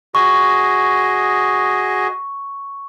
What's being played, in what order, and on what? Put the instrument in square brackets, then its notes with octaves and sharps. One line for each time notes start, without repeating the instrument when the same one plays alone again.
[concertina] F#4 G#4 D#5 [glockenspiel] C#6